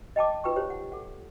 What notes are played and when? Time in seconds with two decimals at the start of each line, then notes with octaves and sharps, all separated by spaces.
0.16 D#5 G5 A5 D6
0.44 D#4 F4 B4 G5 G#5 C#6
0.56 G4 C5 C#5
0.70 F#5
0.92 A4 F#5